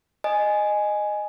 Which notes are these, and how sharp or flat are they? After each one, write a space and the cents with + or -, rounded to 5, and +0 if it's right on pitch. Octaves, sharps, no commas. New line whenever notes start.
D#5 -15 G#5 +5